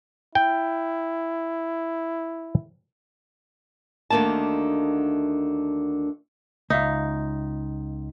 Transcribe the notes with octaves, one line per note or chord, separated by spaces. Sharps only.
E4 G5
D2 D3 D#3 A#3 A5
C#2 D#4 E5 F5